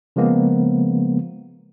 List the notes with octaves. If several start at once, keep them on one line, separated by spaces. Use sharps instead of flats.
C#3 F3 G#3 A#3 B3